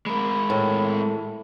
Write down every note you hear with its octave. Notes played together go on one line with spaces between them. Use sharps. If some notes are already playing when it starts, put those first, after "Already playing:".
G#3 A#4 B5
A2